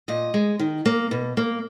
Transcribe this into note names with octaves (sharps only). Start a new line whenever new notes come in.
A#2 D#5
G#3
D#3
A#3
B2
A#3